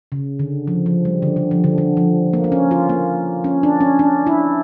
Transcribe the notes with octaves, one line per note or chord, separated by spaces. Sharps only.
C#3
D3
F3
F3
G3
D3
D3
F3
D3
D3
F3
A#3
A#3
C#4
F4
A#3
C#4
D4
C#4
D4
E4